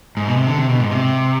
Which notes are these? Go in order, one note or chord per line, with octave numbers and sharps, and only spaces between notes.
G#2
B2
C3
D3
C3
B2
G#2
C3